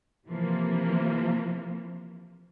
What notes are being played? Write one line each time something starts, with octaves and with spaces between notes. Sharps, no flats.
C3 E3 F3 A#3